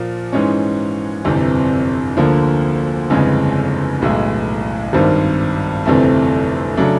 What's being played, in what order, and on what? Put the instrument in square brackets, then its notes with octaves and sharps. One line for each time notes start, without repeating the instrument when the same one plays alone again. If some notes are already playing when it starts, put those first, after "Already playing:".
Already playing: [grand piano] A#2 F3 A#3
G#2 E3 G#3 C#4
G1 F2 C3 E3
D2 D3 F3 A#3
G1 F2 C#3 E3 G#3
B1 A2 E3 G#3
G#1 G2 D#3 G3 C4
G1 F2 C3 E3 A3
C#3 F#3 A3 D4